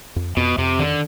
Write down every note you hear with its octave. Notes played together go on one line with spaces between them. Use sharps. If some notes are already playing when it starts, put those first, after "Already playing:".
F2
F2 B2
F2 C3
D3 D#3